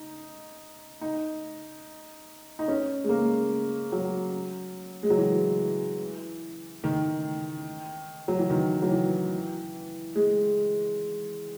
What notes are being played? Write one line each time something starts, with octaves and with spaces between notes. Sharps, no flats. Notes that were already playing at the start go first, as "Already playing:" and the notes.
Already playing: D#4
D#4
D#4
C#4
G#3
A#3
F#3
G#3
F#3
E3
D#3
F#3
E3
D#3
F#3
E3
G#3